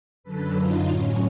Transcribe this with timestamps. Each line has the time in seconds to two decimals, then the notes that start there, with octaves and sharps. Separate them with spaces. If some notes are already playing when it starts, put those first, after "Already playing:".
0.24 F#2 D3 F#3 A4 B4
0.55 F#2 D3 F#3 D#4 F4
0.86 A2 F#3 C#4